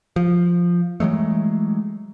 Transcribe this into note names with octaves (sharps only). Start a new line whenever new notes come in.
F3
E3 F#3 G#3 A3